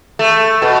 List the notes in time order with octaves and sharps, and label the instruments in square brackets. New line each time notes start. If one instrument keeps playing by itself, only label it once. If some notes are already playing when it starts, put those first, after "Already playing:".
[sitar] A3
B2